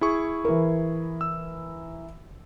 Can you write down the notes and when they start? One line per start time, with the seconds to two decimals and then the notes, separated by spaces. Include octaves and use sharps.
0.01 E4 G#4 C#6
0.45 E3 A#4
1.21 E6